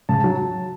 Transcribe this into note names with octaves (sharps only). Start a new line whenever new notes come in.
C#3 A5
F#3